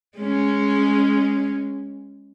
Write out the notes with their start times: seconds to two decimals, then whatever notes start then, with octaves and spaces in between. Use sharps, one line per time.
0.18 G#3 C#4